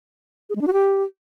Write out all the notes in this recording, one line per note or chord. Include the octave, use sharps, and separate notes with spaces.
G#4
G#3
D4
F#4
G4